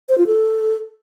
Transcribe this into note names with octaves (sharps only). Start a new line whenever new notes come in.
C5
F4
A4